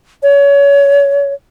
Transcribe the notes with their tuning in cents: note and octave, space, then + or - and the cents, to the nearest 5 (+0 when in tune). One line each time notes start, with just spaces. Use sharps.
C#5 +25